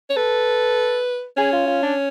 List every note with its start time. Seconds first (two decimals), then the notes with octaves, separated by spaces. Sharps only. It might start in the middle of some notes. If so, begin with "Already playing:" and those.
0.10 C#5
0.16 A4 B4
1.37 C#4 G#4
1.53 F4
1.67 F4
1.83 D4